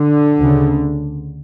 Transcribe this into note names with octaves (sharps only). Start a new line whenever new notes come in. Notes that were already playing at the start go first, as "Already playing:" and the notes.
Already playing: D3
D2 C#3